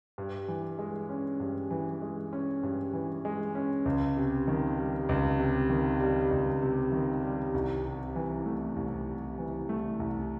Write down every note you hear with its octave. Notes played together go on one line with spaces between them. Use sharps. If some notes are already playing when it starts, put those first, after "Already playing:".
G2
E3
G#3
C#4
G2
E3
G#3
C#4
G2
E3
G#3
C#4
C#2
C3
D#3
G3
C#2
C3
D#3
G3
C#2
C3
D#3
G3
C2
C3
E3
A3
C2
C3
E3
A3
C2